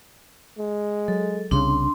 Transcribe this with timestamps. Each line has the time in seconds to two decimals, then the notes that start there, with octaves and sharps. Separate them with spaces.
0.59 G#3
1.08 F#3 A4
1.51 C2 C#3 D4 C6